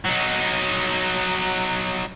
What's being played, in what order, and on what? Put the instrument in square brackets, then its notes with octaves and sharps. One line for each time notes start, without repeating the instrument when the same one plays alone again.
[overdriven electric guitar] F#3 D#4